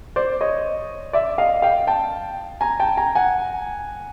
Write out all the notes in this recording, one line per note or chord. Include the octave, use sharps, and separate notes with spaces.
C5 D5
C#5 D#5
D5 E5
D#5 F5
F5 G5
G5 A5
G#5 A#5
G5 A5
G#5 A#5
F#5 G#5